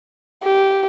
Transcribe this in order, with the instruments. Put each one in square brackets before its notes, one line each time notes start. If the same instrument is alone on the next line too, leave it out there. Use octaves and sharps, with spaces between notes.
[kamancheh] G4